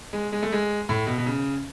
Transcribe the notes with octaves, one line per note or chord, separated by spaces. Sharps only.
G#3
G#3
A3
G#3
A2
B2
B2
C#3